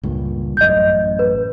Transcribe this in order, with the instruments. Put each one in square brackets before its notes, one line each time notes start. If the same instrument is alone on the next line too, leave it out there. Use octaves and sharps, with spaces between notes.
[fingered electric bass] C#2 G2 A#2
[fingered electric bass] A1 F#2 [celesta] D#5 G6
[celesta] B4